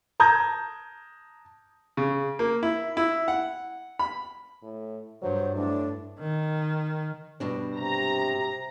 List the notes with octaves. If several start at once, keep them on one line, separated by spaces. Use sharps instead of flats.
A5 A#5 D#6 G6 G#6 A#6
C#3
A#3
E4
E4
F#5
B5
A2
G2 F#3 C5
A2 D4
D#3
G2 B2 D4
C3 A#5